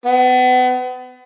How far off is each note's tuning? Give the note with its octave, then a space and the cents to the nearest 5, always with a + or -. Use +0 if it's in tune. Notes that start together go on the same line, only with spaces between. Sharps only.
B3 +35